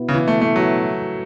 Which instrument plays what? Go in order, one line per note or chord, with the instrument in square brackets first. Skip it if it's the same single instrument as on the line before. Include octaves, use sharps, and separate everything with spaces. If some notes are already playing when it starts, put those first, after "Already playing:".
Already playing: [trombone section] B2 B3 E4
[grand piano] C#3
E3
A3
A3
F#3